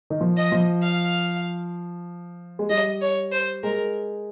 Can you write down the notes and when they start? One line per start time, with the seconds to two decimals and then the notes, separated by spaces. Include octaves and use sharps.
0.10 D#3
0.21 F3
0.37 D#5
0.52 F3
0.83 F5
2.59 G#3
2.70 G3 D#5
3.01 C#5
3.32 C5
3.63 G#3 A#4